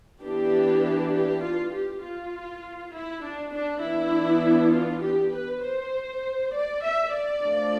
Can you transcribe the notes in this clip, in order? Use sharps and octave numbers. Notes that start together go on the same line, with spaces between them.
E3 B3 D4 G4
G4
F4
G4
F4
E4
D4
D4
E3 B3 D4 E4
F4
G4
B4
C5
D5
E5
D5
F3 A3 D4